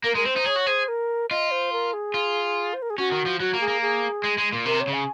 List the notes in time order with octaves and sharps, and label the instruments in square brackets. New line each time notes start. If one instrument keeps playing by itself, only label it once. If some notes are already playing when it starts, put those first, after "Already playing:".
[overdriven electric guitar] A#3 [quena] A#4
[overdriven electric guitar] G#3 [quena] A#4
[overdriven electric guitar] C4 [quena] C5
[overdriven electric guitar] D#4
[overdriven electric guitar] G#4 [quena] C#5
[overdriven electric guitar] F#4
[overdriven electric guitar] G#4 [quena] C5
[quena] A#4
[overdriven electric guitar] F4 [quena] D#5
[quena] C5
A#4
G#4
[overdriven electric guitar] F4
[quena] C5
A#4
G#4
[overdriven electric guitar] C#4 [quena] F#4
[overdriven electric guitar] D#3
F3
[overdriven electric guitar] F#3 [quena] F#4
[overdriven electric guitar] A#3
[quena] G#4
[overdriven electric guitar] A#3
[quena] G#4
[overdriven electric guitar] G#3
G#3
A#2
[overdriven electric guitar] C3 [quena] A#4
[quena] C#5
[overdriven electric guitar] C#3
[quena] G#5